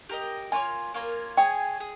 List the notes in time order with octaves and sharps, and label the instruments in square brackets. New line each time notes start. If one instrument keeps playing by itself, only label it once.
[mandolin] G4 A#4 D#5
[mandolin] A#3 F4 A#4 C#5 [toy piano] G#5
[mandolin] A#3 F4 A#4 C#5
[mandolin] G#4 C#5 G#5 [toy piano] G5
[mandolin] G#4